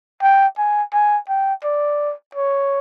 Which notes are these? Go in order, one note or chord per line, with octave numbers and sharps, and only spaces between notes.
G5
G#5
G#5
G5
D5
C#5